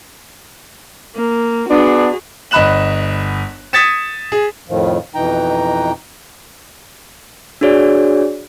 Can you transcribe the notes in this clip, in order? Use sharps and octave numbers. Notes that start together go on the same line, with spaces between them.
A#3
B3 D4 F#4 G#4
G1 D#5 B5 F#6 E7 F#7
D#6 G#6 A6 B6 C#7 E7
G#4
F2 A2 D#3 F3
F2 B2 E3 D#4 G5 A#5
D4 F#4 G#4 C#5 D5